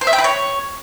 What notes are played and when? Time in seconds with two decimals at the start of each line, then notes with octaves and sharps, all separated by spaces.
0.01 C5
0.07 E5
0.13 G5
0.18 B4
0.24 C#5